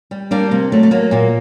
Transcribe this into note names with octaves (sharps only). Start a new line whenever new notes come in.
G3
G3 A#3 D4
C3 A#3
F#3 A3
A3
F#3 A#3
A#2 A#3